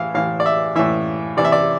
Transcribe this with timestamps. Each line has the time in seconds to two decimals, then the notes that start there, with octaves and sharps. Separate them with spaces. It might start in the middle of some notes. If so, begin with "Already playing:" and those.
Already playing: A2 E3 E5 F5
0.14 A2 E3 F5
0.40 D5
0.46 E5
0.75 A2 E3 E5
1.37 C3 E3 D5
1.44 E5
1.52 D5